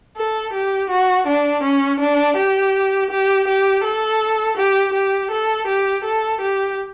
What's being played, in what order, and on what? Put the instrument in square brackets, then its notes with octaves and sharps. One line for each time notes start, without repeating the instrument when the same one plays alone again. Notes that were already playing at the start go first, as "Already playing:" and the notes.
[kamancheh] A4
G4
F#4
D4
C#4
D4
G4
G4
G4
A4
G4
G4
A4
G4
A4
G4